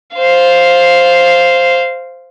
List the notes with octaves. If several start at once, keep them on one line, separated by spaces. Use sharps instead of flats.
C5 F5